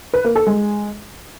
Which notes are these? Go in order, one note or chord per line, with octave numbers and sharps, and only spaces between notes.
B4
A#3
A4
G#3